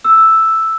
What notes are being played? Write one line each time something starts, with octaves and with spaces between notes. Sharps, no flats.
E6